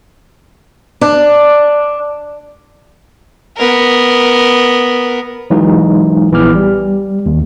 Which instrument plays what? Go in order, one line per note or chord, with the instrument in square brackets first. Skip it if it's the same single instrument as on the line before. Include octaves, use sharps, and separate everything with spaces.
[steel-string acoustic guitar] D4
[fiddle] B3 A#4
[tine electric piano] E3 F#3 G#3 D#4
A#1 E3 B3 D6 F6
G3
D#2